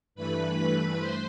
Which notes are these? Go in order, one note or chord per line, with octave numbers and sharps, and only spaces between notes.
G2 E3 A3 B4 B5
B4 B5
C5 C6